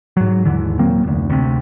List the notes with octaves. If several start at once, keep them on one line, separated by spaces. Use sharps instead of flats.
G#2 F#3
D#2 G#2 D3 E3
D#1 F#3 A#3 C4
F1 D2
D2 C3